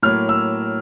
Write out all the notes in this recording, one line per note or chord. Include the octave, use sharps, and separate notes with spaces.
A2 F#3 A#3 F6
E6